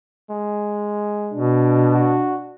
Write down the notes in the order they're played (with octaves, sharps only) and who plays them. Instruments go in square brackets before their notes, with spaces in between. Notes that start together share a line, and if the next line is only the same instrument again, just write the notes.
[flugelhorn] G#3
[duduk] B2 [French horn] D4
[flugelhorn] F#4